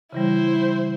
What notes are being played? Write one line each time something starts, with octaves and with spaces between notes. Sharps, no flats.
C#3 E3 G3 E4 C5